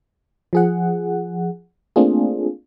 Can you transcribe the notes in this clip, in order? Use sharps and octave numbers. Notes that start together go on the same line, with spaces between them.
F3 G#4 F#5
A3 A#3 C4 D4 F4 G#4